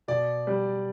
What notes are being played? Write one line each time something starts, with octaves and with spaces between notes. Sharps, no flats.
B2 D5
G3